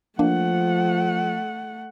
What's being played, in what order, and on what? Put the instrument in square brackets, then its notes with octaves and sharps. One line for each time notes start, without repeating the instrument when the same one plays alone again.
[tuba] F3 [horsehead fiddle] A3 F#5 [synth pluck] A#3 D4